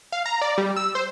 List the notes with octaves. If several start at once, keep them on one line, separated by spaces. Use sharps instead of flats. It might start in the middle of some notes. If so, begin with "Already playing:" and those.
F5
A#5
D5
G3
E6
C5